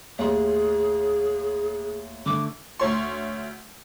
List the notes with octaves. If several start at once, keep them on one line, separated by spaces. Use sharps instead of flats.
D#2 A2 G#4 C6
D3 A3 D6
D2 C#5 C6